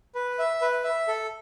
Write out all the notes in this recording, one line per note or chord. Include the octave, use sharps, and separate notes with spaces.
B4
E5
B4
E5
A4